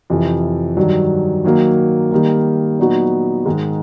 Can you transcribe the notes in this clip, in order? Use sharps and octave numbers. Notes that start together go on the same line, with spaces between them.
F2 C3 E3
G2 D#3 F#3
D#3 F#3 A#3
D#3 G3 A#3
A#2 F#3 B3 D#4 F#4
G#2 D#3 G#3